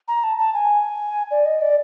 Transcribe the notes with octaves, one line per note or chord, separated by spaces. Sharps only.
A#5
A5
A5
G#5
D5
D#5
D5